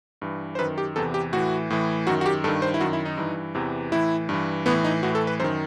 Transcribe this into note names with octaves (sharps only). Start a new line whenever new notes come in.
G2 E3
C5
F#2 D#3 B4
G4
E2 C3 E3 A4
G4
A2 E3 F#4
A2 E3
F#2 D#3 F#4
F#4
G4
G2 D#3 A4
C5
E4
F#2 D#3 F#4
E4
D#4
G2 E3
E2 C3 E3
A2 E3 E4
G2 E3
A2 E3 B3
D#4
A2 E3 F#4
A4
B4
F#2 D#3 C5